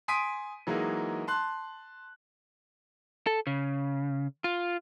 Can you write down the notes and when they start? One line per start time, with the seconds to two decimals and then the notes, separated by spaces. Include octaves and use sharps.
0.08 G#5 C6 D#6 B6 D7 D#7
0.67 E3 F#3 G#3 A#3 D#4
1.27 A5 C6 F#6
3.27 A4
3.47 C#3
4.44 F4